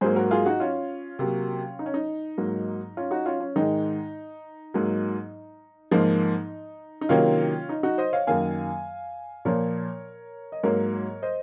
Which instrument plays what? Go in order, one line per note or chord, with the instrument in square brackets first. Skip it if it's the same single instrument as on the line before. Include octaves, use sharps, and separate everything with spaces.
[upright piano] G#2 F#3 A#3 G#4 C5
F#4 A#4
F4 G#4
D#4 F#4
C#4 F4
C3 F#3 A#3
D#4
C#4
D#4
G#2 F#3 A#3
C#4 F4
D#4 F#4
C#4 F4
C#4
G#2 D#3 G#3 D#4
G#2 F#3 A#3
G#2 F3 A#3 D#4
D#4
C3 D#3 F#3 A#3 C#4 F4
D#4
D#4 F#4
C5 D#5
C#5 F5
F#2 D#3 A#3 F5 G#5
A#2 F3 A#3 A#4 C#5
D#5
G#2 F#3 A#3 A#4 C#5
C5 D#5